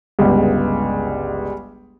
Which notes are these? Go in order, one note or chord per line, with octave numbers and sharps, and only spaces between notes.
G1 C#2 G3 G#3